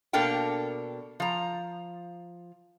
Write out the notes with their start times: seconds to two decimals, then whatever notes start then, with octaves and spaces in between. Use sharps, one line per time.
0.13 B2 A#3 D4 A4 A#4 G5
1.20 F3 A#5